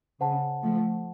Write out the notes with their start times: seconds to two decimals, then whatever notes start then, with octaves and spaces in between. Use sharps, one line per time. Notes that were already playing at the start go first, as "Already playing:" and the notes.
0.20 C#3 C5 F#5 A5
0.62 F3 A3